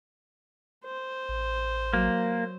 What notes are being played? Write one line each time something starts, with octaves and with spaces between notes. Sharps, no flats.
C5
A1
F#3 A#3